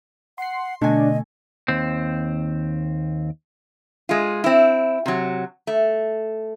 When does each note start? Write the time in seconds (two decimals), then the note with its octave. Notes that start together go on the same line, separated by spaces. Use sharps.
0.38 F#5 C6 C7
0.81 B2 D3 A3 D4 D#5 G#5
1.68 D#2 C4
4.09 G#3 F4
4.44 C4 E4
5.06 C3 F#3
5.67 A3